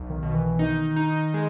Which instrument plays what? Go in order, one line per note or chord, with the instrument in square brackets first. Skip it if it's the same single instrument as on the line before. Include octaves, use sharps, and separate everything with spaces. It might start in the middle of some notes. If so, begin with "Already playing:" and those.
Already playing: [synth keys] B1
[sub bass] D#3
[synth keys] B2
[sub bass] E3
[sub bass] D#3 [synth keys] D#4
[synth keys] D#4
G#3